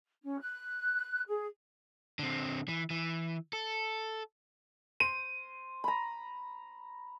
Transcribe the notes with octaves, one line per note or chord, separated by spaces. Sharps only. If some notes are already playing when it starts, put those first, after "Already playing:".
C#4
F#6
G#4
D3 C4
E3
E3
A4
C5 D#7
A#5 B5